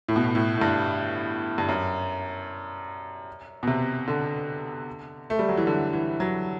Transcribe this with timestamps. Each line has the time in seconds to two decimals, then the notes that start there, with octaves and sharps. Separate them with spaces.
0.08 A2
0.16 B2
0.24 A2
0.35 A2
0.57 A2
0.61 G2
1.58 G2
1.69 F#2
3.63 B2
3.67 C3
4.08 D3
5.30 A3
5.39 G3
5.49 F#3
5.57 E3
5.67 D3
5.93 E3
6.20 F#3